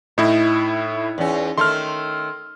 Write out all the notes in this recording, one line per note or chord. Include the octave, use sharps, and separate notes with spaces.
A2 D#4 E4
E2 C#4
D#3 A3 C6 F6